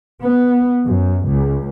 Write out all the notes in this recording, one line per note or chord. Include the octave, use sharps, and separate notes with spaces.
B3
F#2
C#2